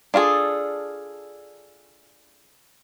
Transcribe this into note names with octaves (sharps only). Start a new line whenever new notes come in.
D4 F4 F#4 G#4 A4